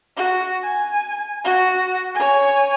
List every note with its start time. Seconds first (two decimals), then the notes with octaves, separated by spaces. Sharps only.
0.17 F#4
0.64 G#5
1.44 F#4
2.15 C#5 G#5